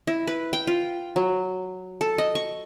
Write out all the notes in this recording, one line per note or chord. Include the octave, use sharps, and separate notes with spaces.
E4
B4
G5
F4
F#3
A4
D#5
C#6